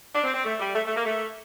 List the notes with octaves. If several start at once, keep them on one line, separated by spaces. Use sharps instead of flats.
D4
C4
C4
A3
G3
A3
A3
A#3
A3